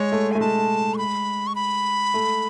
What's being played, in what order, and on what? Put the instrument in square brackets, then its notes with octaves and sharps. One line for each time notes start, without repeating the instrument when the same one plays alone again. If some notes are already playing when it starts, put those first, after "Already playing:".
Already playing: [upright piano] G#3 [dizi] C#5
[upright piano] A3
[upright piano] A3 [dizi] G#5
[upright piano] G#3 [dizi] A5
[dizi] C#6
B5
C#6
B5
[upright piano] A3